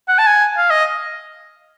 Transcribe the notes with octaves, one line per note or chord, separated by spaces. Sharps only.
F#5
A5
G#5
F5
D#5